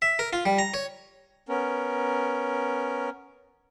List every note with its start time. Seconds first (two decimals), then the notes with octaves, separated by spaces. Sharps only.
0.02 E5
0.19 A#4
0.33 F4
0.46 G3
0.58 A#5
0.74 C#5
1.49 B3 C#4 A#4